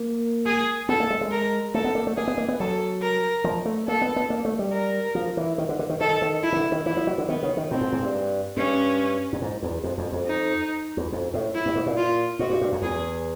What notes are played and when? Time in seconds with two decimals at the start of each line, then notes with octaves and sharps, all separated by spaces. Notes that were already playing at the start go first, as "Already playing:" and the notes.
Already playing: A#3
0.46 G#4
0.89 B3 A4
1.00 A#3
1.10 G#3
1.21 G#3
1.32 A#4
1.74 A3 A4
1.84 B3
1.95 A#3
2.07 A3
2.17 A#3 G#4
2.28 B3
2.38 A#3
2.48 B3
2.59 F#3 A4
3.02 A#4
3.44 F3
3.65 A3
3.88 A#3 A4
4.02 B3
4.16 B3
4.30 A#3
4.45 A3
4.59 G3
4.72 A#4
5.15 F3
5.37 E3
5.58 D#3
5.69 D3
5.79 D3
5.89 D#3
6.00 D#3 A4
6.22 D#3
6.43 E4
6.52 C#3
6.57 D3
6.72 D#3
6.86 E3 E4
6.97 F3
7.07 F#3
7.18 D3
7.28 D#3 B3
7.43 C#3
7.57 D#3
7.71 A2 C4
7.81 G#2
7.92 G#2
8.02 G2
8.57 G2 C#4
9.33 G2
9.42 G#2
9.62 E2
9.84 F2
9.98 F2
10.12 F2
10.27 D#4
10.97 E2
11.12 F2
11.34 A2
11.54 E4
11.66 G2
11.75 G#2
11.86 A#2
11.97 F4
12.39 G#2 F#4
12.50 G2
12.61 G2
12.72 F2
12.82 E2 G#4